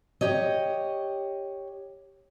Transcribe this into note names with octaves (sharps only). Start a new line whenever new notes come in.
G4 C#5 D#5